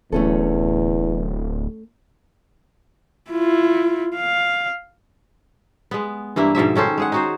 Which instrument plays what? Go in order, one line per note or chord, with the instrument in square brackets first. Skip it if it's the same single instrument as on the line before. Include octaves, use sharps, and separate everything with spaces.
[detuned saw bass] D1 [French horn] E2 [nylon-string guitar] A3 C#4 A4
[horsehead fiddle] E4 F4
F5
[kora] G#3 B3
G2 E3 A#3 E4
G#2 B2 F3 E5
D#3 C#4 A4 C5
G#3 G#4 F#5
D#4 F#4 C5